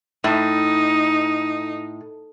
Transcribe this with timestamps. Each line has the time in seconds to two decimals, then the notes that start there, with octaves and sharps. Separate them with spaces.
0.24 A2 D#4